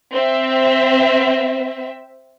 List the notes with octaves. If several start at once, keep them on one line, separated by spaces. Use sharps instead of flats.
C4 E5